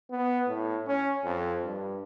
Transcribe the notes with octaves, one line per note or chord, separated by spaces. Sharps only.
B3
A2
C#4
F2
G2